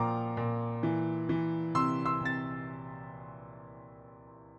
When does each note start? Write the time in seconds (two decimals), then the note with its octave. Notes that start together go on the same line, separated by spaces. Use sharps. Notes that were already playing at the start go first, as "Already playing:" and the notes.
Already playing: A#2 F3 G5 A#5 D6
0.37 A#2
0.83 E3
1.29 E3
1.74 C3 C6 E6
2.05 C6 E6
2.21 C3 A6